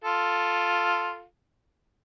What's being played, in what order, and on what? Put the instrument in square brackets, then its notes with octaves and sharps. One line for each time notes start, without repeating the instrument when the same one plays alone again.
[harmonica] F4 A4